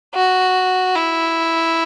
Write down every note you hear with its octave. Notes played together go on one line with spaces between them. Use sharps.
F#4
E4